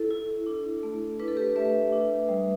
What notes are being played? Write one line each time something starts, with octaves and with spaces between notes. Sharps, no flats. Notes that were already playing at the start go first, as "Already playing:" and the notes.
Already playing: E4 A4
E4
D4
A3
D4 B4
A4
G4 B4
A3 B4 E5
D4
G3